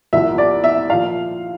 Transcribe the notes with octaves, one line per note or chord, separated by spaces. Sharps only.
C2 A#2 F3 E5
D5
E5
A#2 F3 F5